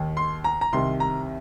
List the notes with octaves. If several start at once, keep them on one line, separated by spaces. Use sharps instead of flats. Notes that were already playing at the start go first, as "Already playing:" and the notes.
Already playing: D#2 D#3
C6
A#5
A#5
C2 C3 D#3 C6
A#5